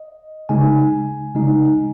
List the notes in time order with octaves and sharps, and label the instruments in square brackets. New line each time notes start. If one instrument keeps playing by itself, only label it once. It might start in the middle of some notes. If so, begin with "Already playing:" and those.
Already playing: [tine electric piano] D#5
C#3 G#3 D#4 G#5
C#3 G#3 D#4